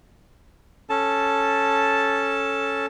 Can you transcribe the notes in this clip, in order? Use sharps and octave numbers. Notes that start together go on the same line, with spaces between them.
C#4 A4 A5